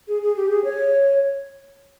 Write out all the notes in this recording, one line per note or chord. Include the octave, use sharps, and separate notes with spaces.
G#4
G#4
G4
G#4
C#5